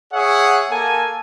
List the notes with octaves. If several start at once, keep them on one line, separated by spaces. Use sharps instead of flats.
G#4 C#5 E5 F#5
A#3 A4 G#5